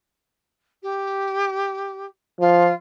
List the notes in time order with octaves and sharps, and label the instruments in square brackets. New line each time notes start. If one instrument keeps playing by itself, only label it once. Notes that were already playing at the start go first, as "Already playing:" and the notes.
[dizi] G4
[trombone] F3 [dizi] F4